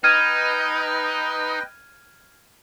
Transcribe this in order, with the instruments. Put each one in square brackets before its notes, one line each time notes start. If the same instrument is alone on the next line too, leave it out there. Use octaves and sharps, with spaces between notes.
[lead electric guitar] D#4 [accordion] B4 D#5 G5 [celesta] F6 G#6 D#7